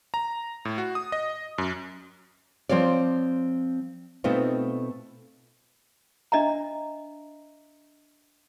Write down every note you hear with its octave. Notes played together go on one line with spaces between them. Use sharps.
A#5
A2
F#4
D#6
D#5
F#2
F3 C4 F4 C#5 D5
B2 A3 C4 D#4 F4
D4 D#5 E5 A#5